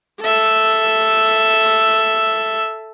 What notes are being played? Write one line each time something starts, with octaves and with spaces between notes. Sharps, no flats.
A4 E5